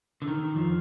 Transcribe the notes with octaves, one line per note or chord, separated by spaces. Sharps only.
D3
D#3
F2 F3